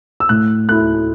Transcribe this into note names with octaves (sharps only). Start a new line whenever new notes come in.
E6
A2 F#6
A3 E4 F#6